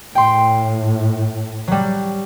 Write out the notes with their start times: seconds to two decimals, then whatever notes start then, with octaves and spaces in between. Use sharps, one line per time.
0.15 A2 G5 C6
1.68 F#3 G3